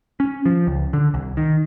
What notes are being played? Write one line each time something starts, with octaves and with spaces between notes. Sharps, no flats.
C#4
F3
C#2
D3
C2
D#3